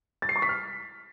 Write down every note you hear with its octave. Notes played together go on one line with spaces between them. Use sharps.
A6
C7
C#6
B6
F6